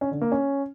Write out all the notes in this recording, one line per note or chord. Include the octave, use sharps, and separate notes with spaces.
C#4
D3
A#3
C#4